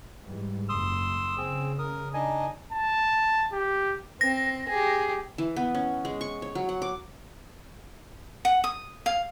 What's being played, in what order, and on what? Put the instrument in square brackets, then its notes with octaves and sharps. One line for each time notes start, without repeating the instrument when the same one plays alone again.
[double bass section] G#2 E3 G3
[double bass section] F#1 [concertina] C6 D#6 [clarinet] E6
[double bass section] C#3 [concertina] C4 G#4
[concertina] A#4 D#6
[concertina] D4 D#4 D#5 [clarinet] G#5
[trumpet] A5
G4
[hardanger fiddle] C4 [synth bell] A#6
[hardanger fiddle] G4 G#4
[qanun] E3
B3
C#4
G#3
C#6
C#5
F#3
F#5
D6
[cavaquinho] F#5
D#6
F5